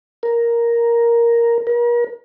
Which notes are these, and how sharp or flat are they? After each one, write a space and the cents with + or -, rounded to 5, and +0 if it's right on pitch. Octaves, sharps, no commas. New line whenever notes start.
A#4 +5
A#4 +40